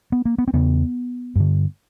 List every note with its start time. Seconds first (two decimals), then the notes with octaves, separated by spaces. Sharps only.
0.12 B3
0.25 A#3
0.38 B3
0.48 C4
0.53 E2 C#3 B3
1.36 G2 D3